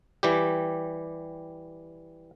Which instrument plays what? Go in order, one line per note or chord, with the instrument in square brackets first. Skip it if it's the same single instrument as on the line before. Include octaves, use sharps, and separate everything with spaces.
[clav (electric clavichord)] E3 G3 G4